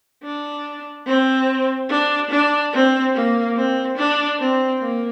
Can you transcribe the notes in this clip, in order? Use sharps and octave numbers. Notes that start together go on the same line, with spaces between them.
D4
C4
D4
D4
C4
A#3
C4
D4
C4
A#3